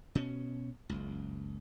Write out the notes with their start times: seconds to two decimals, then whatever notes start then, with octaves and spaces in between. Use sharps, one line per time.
0.15 B2 C#4
0.89 F#1 C#2